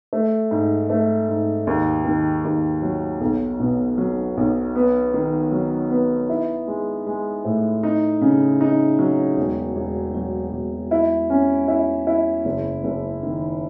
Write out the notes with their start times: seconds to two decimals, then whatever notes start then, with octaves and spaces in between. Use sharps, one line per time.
0.13 A3
0.51 G#2
0.90 A3
1.29 G#2
1.67 D#2
2.05 D#3
2.44 D#2
2.82 F#3
3.21 B1
3.60 B2
3.98 F#3
4.37 B1
4.76 B3
5.14 D#3
5.52 F#3
5.90 B3
6.29 E4
6.68 G#3
7.07 G#3
7.45 A2
7.83 D#4
8.21 C#3
8.61 D#4
8.99 F#3
9.37 E1
9.76 E1
10.14 F#3
10.53 E1
10.91 E4
11.30 C#4
11.68 E4
12.07 E4
12.45 F#1
12.84 F#1
13.23 D#3